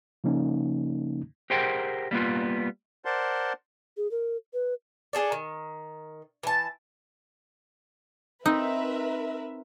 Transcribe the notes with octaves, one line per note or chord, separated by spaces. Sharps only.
C#3 F3 A#3 C#4 D#4
G4 G#4 A#4 C5 F#5 G5
G3 A#3 B3 F4
A#4 C5 D5 F#5 A5 C6
G#4
A#4
B4
D4 G#4 A4 D5
D#3
E3 A5
C4 D#4 A#4 B4 E5